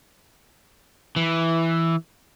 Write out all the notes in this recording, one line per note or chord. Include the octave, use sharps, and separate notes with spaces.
E3